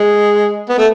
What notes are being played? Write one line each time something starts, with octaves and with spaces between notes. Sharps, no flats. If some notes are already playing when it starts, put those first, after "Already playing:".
Already playing: G#3
B3
A3